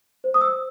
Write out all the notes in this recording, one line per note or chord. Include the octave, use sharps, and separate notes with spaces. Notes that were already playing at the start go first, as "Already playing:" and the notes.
C5
D#6
E6